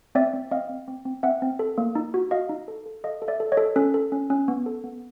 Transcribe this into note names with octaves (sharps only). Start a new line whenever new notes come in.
C4 D5 E5
C4
C4 D#5 F5
C4
C4
C4
C4 E5 F#5
C4
A4
A#3
D#4
F#4
F#4 D#5 F5
D#4
A4
A4
A4 D#5 F5
A4
D5 E5
A4
C#5 D#5
A4
C#4 A4
A4
C#4
C#4
B3
A4
B3